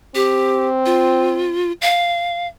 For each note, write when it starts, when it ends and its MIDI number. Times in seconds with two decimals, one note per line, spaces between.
0.15 1.60 60
0.15 0.68 67
0.86 1.72 65
1.82 2.47 77